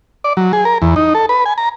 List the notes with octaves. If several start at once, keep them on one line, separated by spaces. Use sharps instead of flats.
D5
F#3
G#4
A#4
E2
D#4
A4
B4
G#5
A#5